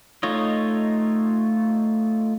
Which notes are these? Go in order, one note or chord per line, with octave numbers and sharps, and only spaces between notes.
A3 D#4 F4 C#5 D#5